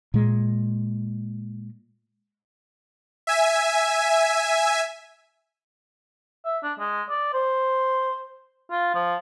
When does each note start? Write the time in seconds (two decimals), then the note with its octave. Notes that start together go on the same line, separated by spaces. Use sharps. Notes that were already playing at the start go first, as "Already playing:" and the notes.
0.14 A#2 G#3
3.27 E5 G#5
6.45 E5
6.63 D4
6.79 G#3
7.09 D5
7.33 C5
8.71 F4
8.95 F3